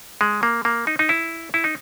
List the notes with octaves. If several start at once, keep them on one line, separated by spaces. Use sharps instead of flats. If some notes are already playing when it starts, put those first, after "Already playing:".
G#3
A#3
A#3
D#4
D#4
E4
E4
D#4